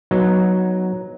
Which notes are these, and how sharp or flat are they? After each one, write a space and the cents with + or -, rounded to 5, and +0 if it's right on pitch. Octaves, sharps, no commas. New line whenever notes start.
F#3 +0 B3 -15 D#4 +0